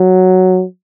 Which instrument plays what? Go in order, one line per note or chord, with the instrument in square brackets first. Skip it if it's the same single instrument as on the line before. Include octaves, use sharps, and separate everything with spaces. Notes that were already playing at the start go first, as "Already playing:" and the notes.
Already playing: [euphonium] F#3